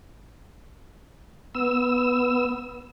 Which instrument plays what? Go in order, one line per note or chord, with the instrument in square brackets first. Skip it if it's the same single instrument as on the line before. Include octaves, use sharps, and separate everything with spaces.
[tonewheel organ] B3 E6